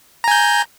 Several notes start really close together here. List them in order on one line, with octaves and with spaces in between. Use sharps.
A#5 G#5 G6